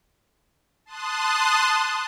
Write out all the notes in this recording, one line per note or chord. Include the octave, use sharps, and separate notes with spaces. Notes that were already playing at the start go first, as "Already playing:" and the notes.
A5 C6 D#6 F#6